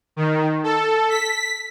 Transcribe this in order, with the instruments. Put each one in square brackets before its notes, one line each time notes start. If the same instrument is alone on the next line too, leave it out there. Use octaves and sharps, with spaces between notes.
[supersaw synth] D#3
A4
B6